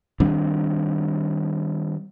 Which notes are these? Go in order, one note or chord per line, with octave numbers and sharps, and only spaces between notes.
D#3 G3 C4 D4